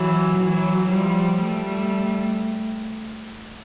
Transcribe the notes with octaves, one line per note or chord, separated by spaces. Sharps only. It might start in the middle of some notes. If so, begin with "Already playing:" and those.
Already playing: E3 F#3
E3 F#3
F3 G3
G3 A3